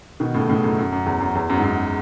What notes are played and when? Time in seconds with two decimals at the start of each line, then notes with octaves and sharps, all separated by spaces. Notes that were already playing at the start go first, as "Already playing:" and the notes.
0.20 B2 D#3
0.34 A2 C#3
0.49 A2 C#3
0.64 F#2 A2
0.78 F#2
0.92 F#2
1.06 E2
1.20 F#2
1.35 E2
1.50 F#2
1.58 G#2
1.63 F#2